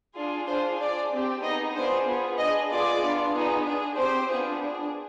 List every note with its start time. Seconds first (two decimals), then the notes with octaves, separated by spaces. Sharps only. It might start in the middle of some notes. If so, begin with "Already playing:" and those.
0.16 D4 F4 G#4
0.47 D4 F4 G#4 C5
0.80 D4 G#4 D5
1.11 C4 G4
1.43 B3 D#4 G#4 D#5
1.75 B3 D4 F4 G#4 C5
2.07 B3 F4 G#4
2.38 D4 G#4 D#5
2.70 B3 F4 G#4 D5
3.02 B3 D4 F4
3.33 B3 D#4 G#4
3.65 D4 G#4
3.97 C4 G4 C5
4.29 B3 D4 F4 G#4
4.60 D4 G#4